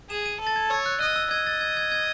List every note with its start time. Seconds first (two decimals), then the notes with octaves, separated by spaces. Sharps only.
0.10 G#4 E7
0.26 D#7
0.41 A4
0.47 A6
0.56 G#6
0.70 C#5 E6
0.86 F#6
1.01 D#5 F#6
1.16 E6
1.31 D#5 G#6
1.47 A6
1.61 G#6
1.77 G#6
1.92 G#6